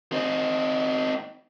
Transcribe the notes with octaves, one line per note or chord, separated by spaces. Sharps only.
C4 D#4